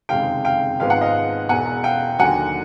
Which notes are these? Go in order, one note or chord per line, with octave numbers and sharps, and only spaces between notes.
F#1 F2 C3 D#3 G#3 F5 G5
F5 G5
G#1 G#2 F3 G#3 B3 F5
F#5
D#5 F5
E1 E2 B2 F#5 G#5
F5 G5
D#2 D3 F#3 F#5 G#5